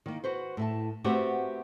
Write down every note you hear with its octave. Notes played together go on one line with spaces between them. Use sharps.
D#3 A#3
F#4 B4 C5
A2 E5 A5
A3 B3 C4 F#4 G4 C5